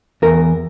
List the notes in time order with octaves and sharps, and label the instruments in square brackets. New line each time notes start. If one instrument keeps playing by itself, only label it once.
[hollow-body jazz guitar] E2 A#4